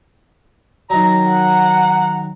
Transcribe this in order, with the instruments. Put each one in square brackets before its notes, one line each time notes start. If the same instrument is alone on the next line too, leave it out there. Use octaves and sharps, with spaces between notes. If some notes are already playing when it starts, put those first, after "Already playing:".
[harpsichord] D#3 F#3 [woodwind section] A#5
[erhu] F#5